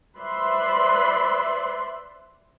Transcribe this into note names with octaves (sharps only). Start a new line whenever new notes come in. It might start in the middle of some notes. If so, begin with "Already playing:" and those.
B4 C5 D5 E5 B5 C6